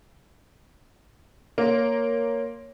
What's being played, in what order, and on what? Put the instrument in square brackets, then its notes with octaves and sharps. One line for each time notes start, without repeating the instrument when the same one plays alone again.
[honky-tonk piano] A#3 [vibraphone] C#5 C6